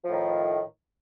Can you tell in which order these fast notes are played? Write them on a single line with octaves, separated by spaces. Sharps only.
F3 A2 D#3